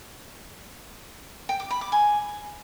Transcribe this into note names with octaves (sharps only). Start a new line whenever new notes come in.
G5
D6
B5
D6
G#5